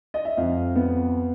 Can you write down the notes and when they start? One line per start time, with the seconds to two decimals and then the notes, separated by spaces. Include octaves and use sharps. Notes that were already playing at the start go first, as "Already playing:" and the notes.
0.14 D#5
0.25 E5
0.37 F2 F5
0.76 B3